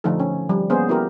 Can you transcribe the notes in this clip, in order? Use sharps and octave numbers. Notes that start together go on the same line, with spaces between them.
D3 F3 A3 D#4 A4
C#4
F3 G3
A#3 B3 C#4 G#4 C5
B3 E4 F#4 G4 A#4